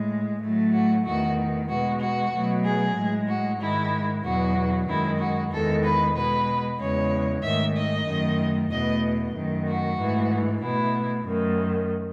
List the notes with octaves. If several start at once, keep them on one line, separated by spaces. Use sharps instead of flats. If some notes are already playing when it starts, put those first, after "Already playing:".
Already playing: A2 G#3
A2 F#3 A3
F#4
E2 D#3 A3 F#4
B2 G#3 F#4
F#4
B2 F#3 A3
G#4
A2 G#3
F#4
G#2 D#3 G#3 E4
E2 B2 F#3 F#4
F#2 D#3 G#3 E4
F#4
E2 D#3 G#3 A4
B4
B2 G#3 B4
E2 C#3 G#3 C#5
G#2 D#3 A3 E5
D#5
F#2 D#3 A3
E2 B2 A3 D#5
F#2 D#3 A3
F#4
G#2 E3 A3
B2 A3 E4
F#2 D#3 A3